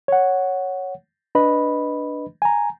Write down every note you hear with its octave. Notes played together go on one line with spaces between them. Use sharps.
C#5 F#5
D4 B4 D#5 B5
G#5 A#5